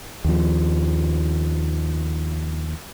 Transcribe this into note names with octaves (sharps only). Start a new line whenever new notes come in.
D#2 F3